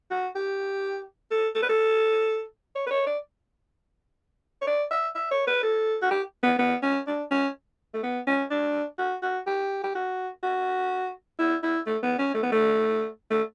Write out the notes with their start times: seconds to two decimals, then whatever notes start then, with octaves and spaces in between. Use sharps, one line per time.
0.11 F#4
0.36 G4
1.31 A4
1.55 A4
1.62 B4
1.69 A4
2.75 C#5
2.86 B4
2.91 C#5
3.07 D5
4.61 C#5
4.67 D5
4.91 E5
5.15 E5
5.31 C#5
5.47 B4
5.63 A4
6.02 F#4
6.11 G4
6.43 B3
6.59 B3
6.83 C#4
7.07 D4
7.31 C#4
7.94 A3
8.03 B3
8.27 C#4
8.51 D4
8.98 F#4
9.22 F#4
9.47 G4
9.83 G4
9.95 F#4
10.43 F#4
11.39 E4
11.63 E4
11.87 A3
12.03 B3
12.18 C#4
12.34 A3
12.43 B3
12.52 A3
13.31 A3